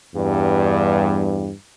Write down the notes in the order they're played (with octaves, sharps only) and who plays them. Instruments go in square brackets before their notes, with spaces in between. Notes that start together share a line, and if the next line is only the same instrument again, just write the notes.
[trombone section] E2 G2